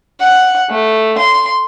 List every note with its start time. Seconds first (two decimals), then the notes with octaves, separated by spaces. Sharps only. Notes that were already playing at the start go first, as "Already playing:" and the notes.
0.20 F#5
0.70 A3
1.18 C6